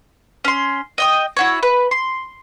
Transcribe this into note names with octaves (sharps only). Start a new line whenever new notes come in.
C#4 C6
D#5 G5 D#6
E4 F#4 C#5
B4
C6